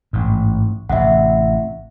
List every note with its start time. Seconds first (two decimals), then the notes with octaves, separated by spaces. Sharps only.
0.13 A1 G#2
0.89 A1 C3 E5 F#5